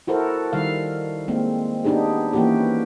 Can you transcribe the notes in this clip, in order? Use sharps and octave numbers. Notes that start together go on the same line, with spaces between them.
E4 F#4 A4 A#4 C5
D#3 G3 F5
G#3 A#3 C4
B3 D4 D#4 G4 G#4
E3 A#3 C#4 E4 F#4 G4